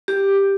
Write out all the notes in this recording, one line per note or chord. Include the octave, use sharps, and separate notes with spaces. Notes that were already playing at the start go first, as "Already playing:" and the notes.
G4